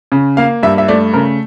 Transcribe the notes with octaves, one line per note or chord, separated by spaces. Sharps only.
C#3
A#3 F5
G2 E5
E5
A3 D5
C#3 A#4